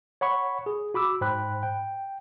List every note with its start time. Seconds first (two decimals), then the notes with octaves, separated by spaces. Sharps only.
0.21 C#5 F#5 B5 C#6
0.66 G#4
0.94 F#4 B5 D6 E6
1.21 G#2 C5 G5 B5 F#6
1.63 G5